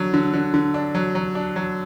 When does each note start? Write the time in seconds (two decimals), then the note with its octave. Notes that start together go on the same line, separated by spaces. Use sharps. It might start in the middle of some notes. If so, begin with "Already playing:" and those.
Already playing: D3 F#3 D4
0.14 D3
0.34 D3
0.54 D3
0.74 D4
0.95 F#3
1.15 F#3
1.35 D4
1.56 F#3